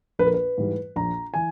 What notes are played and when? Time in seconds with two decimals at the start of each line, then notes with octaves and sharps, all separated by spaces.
0.19 A#1 B4
0.26 A#4
0.34 B4
0.58 G#2 E3 G3
0.96 A#1 A#5
1.34 E3 G#5